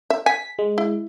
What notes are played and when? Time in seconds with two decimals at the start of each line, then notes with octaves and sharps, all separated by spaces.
0.10 E5
0.26 G#5 B6
0.59 G#3
0.78 E4